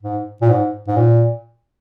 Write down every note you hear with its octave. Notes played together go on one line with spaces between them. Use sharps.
G#2
A#2
G#2
G#2
A#2